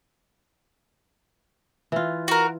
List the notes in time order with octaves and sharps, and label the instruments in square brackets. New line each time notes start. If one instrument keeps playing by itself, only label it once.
[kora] E3 F4
[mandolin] F#4 A#4